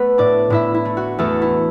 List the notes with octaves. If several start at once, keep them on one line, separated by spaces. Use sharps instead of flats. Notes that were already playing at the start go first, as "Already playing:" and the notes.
Already playing: A3 B3 B4
A2 D4 D5
A2 E4 E5
E4
A3
F#4
E2 A3 A4
E4